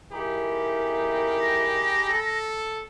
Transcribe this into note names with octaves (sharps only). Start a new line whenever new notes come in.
F2 D#4 E4 G4 G#4 A#4 B5
A#6
A4